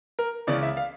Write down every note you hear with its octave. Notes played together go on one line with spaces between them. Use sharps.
A#4
C#2 C#3 E3 D5
E5
F5